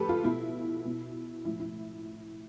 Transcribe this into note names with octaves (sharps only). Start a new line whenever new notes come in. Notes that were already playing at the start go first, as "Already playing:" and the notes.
Already playing: A2 F3 G4 A4 B4
F4
B2 E4
B2
A2 F3 E4
E4